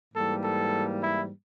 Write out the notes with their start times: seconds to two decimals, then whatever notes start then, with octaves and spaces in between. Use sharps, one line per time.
0.14 G#2 E3 G3 A#3 A4
0.44 A4
1.02 E4